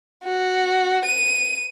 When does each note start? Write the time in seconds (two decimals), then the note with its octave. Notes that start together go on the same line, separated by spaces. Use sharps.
0.24 F#4
1.06 D#7